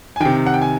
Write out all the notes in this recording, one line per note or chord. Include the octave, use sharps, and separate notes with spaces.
G#5
C3 D#3 G5
F#5
G5
G#5